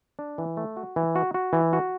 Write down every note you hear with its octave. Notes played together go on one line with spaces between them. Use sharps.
D4
E3
A3
F#4
E3
F#4
F#4
E3
F#4